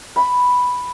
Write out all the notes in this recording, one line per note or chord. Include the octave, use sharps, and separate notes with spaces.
B5